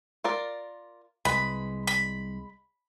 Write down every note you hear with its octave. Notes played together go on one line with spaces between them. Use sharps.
F4 A#4 D5
C2 G#3 B4 B5
B5